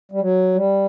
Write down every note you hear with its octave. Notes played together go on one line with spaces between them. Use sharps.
G3
F#3
G3